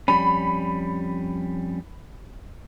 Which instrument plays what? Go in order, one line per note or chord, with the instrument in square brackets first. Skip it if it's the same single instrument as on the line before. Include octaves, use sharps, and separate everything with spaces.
[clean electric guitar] F2 G3 C#4 [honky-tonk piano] B5